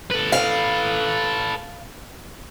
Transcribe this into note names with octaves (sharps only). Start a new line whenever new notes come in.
A4 B4
F5